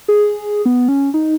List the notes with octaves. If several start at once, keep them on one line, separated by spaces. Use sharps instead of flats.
G#4
B3
C#4
D#4